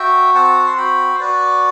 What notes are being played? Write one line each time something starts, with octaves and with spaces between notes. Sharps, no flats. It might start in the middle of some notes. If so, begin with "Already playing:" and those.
Already playing: F#4 E5 G5
C4 F#5 A5
C6
F#4 G5 B5
C5
F#4 B4 D5